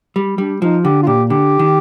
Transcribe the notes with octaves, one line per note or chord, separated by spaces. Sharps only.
G3
G3 D4
F3 D#4
D3 G4
F4
A#2 G4
D3 G4
D#3